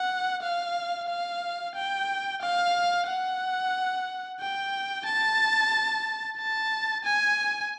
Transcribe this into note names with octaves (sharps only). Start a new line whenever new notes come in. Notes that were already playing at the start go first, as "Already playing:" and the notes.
Already playing: F#5
F5
F5
G5
F5
F#5
G5
A5
A5
G#5